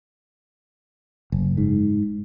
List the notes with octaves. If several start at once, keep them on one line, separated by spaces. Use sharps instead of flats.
F#1
G#2